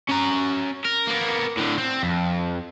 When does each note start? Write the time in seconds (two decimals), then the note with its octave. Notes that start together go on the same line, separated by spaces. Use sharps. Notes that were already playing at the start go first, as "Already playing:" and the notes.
0.09 C#4 A#5
0.85 A#4
1.07 A#3 B3
1.57 A2 D3
1.78 C4
2.03 F2